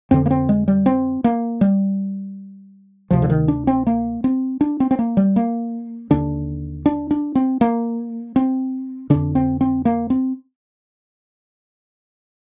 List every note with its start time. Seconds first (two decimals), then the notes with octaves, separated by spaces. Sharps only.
0.11 F2 D3 C4
0.26 A#3
0.31 C4
0.49 G#3
0.68 G3
0.86 C4
1.24 A#3
1.61 G3
3.10 D2 C3 F3
3.22 D3
3.30 D#3
3.48 D4
3.67 C4
3.87 A#3
4.24 C4
4.61 D4
4.80 C4
4.91 C4
4.99 A#3
5.17 G3
5.36 A#3
6.10 D#2 D3 D4
6.86 D4
7.11 D4
7.35 C4
7.61 A#3
8.36 C4
9.10 F2 D3 D4
9.35 C4
9.61 C4
9.85 A#3
10.10 C4